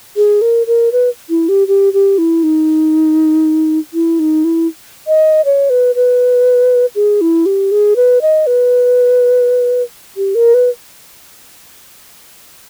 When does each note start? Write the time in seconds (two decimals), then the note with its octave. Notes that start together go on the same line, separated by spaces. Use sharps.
0.16 G#4
0.42 A#4
0.67 A#4
0.92 B4
1.30 E4
1.49 G4
1.68 G4
1.93 G4
2.18 E4
2.43 D#4
3.94 E4
4.19 D#4
4.44 E4
5.07 D#5
5.45 C#5
5.70 B4
5.95 B4
6.95 G#4
7.21 E4
7.46 G4
7.71 G#4
7.96 B4
8.22 D#5
8.47 B4
10.17 G4
10.35 A#4
10.54 B4